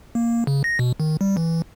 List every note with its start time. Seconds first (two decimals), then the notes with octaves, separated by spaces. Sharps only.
0.15 A#3
0.47 C#3
0.64 A#6
0.79 B2
1.00 D#3
1.21 G3
1.37 E3